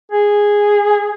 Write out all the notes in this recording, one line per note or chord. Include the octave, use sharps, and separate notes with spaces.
G#4